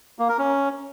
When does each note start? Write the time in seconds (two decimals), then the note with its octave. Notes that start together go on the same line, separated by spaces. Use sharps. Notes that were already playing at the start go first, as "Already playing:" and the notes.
0.19 A#3
0.29 A#4
0.39 C#4